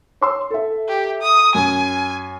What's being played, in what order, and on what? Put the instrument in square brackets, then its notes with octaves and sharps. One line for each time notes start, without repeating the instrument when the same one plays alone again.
[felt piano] C#5 C6 E6
A4 E5
[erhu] G4
D#6
[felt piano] F#2 [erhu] G#5